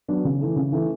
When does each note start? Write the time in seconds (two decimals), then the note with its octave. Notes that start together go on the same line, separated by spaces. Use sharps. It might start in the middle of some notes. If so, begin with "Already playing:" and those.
0.08 F#3 B3 D4
0.24 C#3
0.41 E3 A3
0.56 C#3
0.72 E3 A3